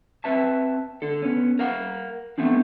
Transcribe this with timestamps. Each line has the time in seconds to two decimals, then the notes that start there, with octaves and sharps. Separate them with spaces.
0.24 C4 B4 E5 A5
1.02 D3 A4
1.22 B3 C#4
1.59 A#4 F5 F#5
2.38 E3 A3 B3 C4 D4